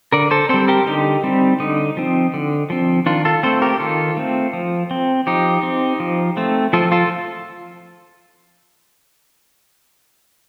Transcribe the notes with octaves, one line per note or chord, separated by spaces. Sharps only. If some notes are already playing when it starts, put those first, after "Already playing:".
D3 A#4 D5
A4 C5
G3 C4 A4 C5
G4 A#4
D3 D#4 G4
G3 C4
D3 D#4
F3 C4
D3
F3 C4
D#3 D4 F4
F4 A4
A3 C4 A4 C5
G4 A#4
D#3 F4 A4
A3 C4
F3
C4
F3 D#4 G4
C4
F3
A3 C4
F3 F4 A4
F4 A4